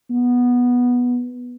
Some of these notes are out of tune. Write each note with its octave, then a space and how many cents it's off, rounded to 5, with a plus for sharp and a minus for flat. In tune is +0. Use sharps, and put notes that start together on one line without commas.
B3 -10